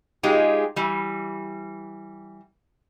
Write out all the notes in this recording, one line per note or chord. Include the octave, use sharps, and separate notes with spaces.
G#3 D#4 F4 G4 G#4
E3 G3